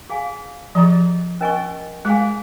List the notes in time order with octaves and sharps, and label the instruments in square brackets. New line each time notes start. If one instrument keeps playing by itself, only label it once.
[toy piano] G#4 F5 G#5
[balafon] F3 [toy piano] G#4 D#5 A#5 C#6
[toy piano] C#4 A#4 D#5 G#5 C#6
[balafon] G#3 [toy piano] G#4 F5 G#5